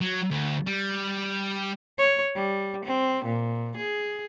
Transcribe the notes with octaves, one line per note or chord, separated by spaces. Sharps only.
F#3
D2
G3
C#5
G3
C4
A#2
G#4